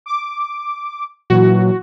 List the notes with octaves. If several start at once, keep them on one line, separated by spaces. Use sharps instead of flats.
D6
A#2 E3 F#3 F#4